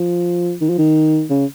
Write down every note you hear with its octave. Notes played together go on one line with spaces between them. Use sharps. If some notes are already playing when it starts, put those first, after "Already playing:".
Already playing: F3
D#3
F3
D#3
C#3